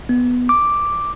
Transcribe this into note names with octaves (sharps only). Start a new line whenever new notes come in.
B3
D6